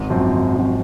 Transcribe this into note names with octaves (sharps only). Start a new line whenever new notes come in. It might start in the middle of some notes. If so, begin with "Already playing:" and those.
Already playing: G#1
F#2 F3 C4 F#4
G#1
F#2 F3 C4 F#4